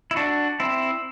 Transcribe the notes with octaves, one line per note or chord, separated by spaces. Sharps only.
E4
D4 F#4
C4 E4